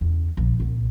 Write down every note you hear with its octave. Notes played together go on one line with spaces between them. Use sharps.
E2 C#3
A#1 F3
C2 A#2